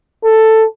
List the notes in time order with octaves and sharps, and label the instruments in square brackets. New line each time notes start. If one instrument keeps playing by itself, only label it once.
[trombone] A4